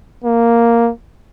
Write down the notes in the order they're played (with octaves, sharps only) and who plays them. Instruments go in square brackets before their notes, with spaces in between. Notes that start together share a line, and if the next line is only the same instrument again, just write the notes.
[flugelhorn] A#3